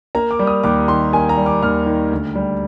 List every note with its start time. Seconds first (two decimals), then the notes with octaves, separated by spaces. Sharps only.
0.15 A#3 A#5
0.31 D6
0.39 G3
0.47 D#6
0.63 D#2 D6
0.88 D#3 C6
1.13 A#3 G#5
1.29 A#5
1.37 G3
1.46 D6
1.62 D#2 F6
1.86 D#3
2.12 D2
2.35 G3